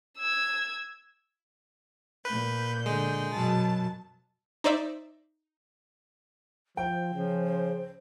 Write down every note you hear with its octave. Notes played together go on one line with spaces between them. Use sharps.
E6 G#6
A#2 B4 G6
D3 G#3
F#2 B2 F#3 A5
D#4 C5 D5 E5
F3 C5 G5
C#3 F3